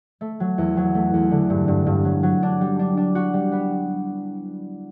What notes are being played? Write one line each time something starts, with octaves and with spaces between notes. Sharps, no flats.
A3
F#3
E2
F#3
A3
E2
D3
G2
G2
G2
F#3
F#3
D4
G3
D4
D4
F#4
G3
B3